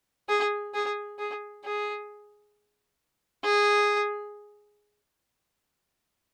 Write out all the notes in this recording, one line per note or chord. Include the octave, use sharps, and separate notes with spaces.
G#4
G#4
G#4
G#4
G#4